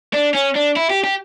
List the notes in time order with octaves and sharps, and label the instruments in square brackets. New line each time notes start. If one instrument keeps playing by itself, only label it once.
[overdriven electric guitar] D4
C#4
D4
E4
G4
G4